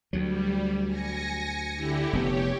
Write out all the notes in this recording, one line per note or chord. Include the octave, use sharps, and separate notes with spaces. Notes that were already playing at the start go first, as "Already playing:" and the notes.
D2 F#3 G3
G#5 A#6 C#7
D3 E4 G4
F1 B3 G4 C#5